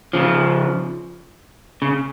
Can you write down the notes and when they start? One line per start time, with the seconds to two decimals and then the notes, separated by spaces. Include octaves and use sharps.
0.13 C#3 F3
1.82 C#3